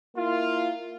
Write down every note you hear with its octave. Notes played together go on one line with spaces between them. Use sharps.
A#3 E4 F4